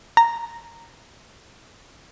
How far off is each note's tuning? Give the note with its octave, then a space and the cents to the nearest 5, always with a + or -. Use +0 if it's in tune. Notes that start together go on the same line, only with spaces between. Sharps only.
A#5 -5